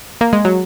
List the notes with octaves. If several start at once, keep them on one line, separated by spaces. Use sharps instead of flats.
A#3
G#3
F#3